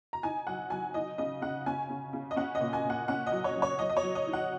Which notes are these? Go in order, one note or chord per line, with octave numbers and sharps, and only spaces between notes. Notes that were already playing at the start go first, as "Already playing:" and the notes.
A#5
D#4 G#5
F#3 F#5
F#3 G#5
D#4 D#5
C#3 D#5
C#3 F#5
C#4 G#5
C#3
C#3
D#5
C#4 F#5
D#5
A#2
G#5
A#2
F#5
C#4 F#5
D#5
F#3
C#5
F#3
C#5
F#3 D#5
D#5
C#5
F#3
D#5
D#4
F#5